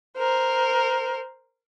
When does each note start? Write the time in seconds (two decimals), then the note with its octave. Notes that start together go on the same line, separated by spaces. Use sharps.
0.18 A#4 C5